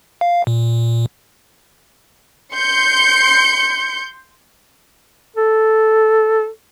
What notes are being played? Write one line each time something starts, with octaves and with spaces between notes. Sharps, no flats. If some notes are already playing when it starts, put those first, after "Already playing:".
F5
A#2
C6 G6 C#7
A4